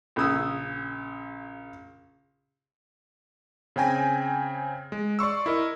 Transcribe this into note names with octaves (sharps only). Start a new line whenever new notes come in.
A#1 C#3 D#6 E6
C#3 C4 G5 G#5 A#6
G#3
D5 C6 C#6 E6
E4 A#4 D#5